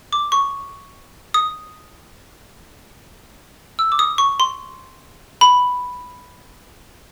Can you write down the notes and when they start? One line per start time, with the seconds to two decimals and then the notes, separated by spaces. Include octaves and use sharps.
0.13 D6
0.32 C#6
1.34 D#6
3.79 E6
3.92 D6
3.99 D#6
4.18 C#6
4.40 C6
5.41 B5